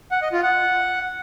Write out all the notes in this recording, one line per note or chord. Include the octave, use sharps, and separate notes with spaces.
F#5
D#5
F4
F#5